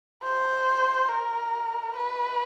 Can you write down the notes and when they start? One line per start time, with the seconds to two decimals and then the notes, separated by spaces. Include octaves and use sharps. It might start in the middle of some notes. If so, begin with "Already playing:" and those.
0.24 C5
1.09 A#4
1.96 B4